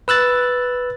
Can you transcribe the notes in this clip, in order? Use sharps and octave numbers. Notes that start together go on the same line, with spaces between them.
B4 E6 F#6 A6